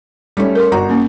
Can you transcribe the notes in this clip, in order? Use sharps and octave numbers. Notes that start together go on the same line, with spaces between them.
G3 A3 C#4
A#4 C#5 C6
G1 F#4 A#5
A#3 C#4